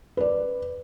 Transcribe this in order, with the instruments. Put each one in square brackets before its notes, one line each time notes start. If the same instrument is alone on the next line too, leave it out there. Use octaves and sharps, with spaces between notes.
[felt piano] B4 D5